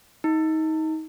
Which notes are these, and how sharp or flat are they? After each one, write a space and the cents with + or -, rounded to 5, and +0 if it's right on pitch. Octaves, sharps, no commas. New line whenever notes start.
D#4 +25